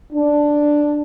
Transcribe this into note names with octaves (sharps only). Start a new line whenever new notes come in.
D4